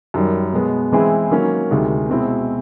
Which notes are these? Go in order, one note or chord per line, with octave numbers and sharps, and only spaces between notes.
F#2 D#3 G3
B2 G#3 B3
E3 G#3 C4 E4 G#4
D#3 F#3 A#3 C#4
D2 C3 D#3 G#3
B2 G#3 C4 E4